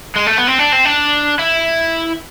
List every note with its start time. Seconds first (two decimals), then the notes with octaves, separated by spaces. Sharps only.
0.16 G#3
0.26 A3
0.37 B3
0.47 C4
0.58 D4
0.72 C4
0.85 D4
1.39 E4